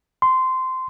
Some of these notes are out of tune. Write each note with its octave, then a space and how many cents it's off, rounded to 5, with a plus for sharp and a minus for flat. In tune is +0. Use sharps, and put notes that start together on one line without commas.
C6 -15